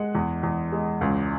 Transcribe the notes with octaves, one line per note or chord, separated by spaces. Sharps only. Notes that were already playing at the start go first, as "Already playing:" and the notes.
Already playing: G#3 F#5
E2
E2
G#3
C#2